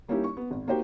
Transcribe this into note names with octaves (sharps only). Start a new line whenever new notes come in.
G3 A#3 C#4 D#4 E4 G4
C#6
B3
G#1
A#3 D#4 F#4 G4 C5 G5